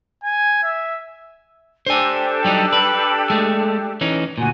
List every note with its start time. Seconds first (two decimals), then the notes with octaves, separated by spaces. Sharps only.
0.24 G#5
0.63 E5
1.86 D4 G4 A4 C5 G#5
2.45 F#3 G3 D#4
2.73 B4
3.30 G#3 A3
4.01 E3 C#4 D#4
4.38 D2 A#2 F#4 G#5